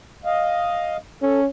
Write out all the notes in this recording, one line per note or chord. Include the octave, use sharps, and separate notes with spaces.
D#5 F5
C#4 A4